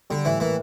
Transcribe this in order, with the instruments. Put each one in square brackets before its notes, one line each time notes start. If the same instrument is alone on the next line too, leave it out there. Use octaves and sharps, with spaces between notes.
[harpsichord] D3 [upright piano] G3
[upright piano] A2 [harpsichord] E3
[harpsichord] E3 [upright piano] A#3